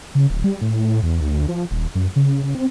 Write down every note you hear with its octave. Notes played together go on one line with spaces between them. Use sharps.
C#3
D1
G3
A2
E2
D2
F3
D#1
F#2
C#3
C#3
C4